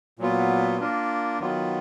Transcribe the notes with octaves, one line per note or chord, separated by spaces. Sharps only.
A#2 F#3 B3 F4
A#3 D4 F4 A#4
D#3 F#3 B3 F4